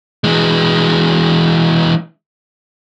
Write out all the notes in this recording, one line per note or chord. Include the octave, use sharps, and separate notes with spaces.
E3 G#3